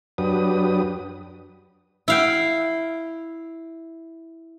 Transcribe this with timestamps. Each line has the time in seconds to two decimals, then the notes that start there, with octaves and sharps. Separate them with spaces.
0.18 F#2 F#3 D4 G4 B4 D#6
2.08 E4 F5 G5